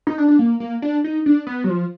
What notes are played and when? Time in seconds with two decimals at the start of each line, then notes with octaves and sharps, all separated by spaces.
0.07 D#4
0.18 D4
0.28 D4
0.39 A#3
0.60 A#3
0.82 D4
1.04 D#4
1.26 D4
1.47 B3
1.64 F#3
1.69 F3